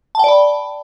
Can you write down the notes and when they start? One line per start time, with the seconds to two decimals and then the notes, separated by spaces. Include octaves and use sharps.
0.15 A5
0.19 G5
0.24 D5
0.28 B5